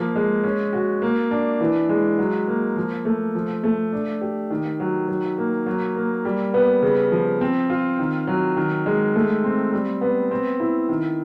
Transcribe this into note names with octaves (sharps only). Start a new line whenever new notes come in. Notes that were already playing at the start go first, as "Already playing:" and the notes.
Already playing: F3 A#3
G#3
C#4
F#4
A#3
D4
E3
G#3
F#3
A#3
F3
A3
F3
A3
D4
G4
D#3
F#3
F#3
A#3
F#3
A#3
G3
B3
C#3
F3
C4
F4
D#3
F#3
D#3
G#3
A3
C4
G3
B3
C4
E4
D#3